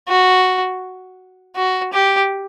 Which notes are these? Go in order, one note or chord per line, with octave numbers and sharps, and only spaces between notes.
F#4
F#4
G4